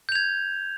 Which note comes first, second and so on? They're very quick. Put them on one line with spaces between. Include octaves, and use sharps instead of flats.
G6 F7 G#6